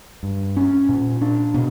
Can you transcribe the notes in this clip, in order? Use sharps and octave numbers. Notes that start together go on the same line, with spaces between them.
G2
C#4
A#2
D4
B2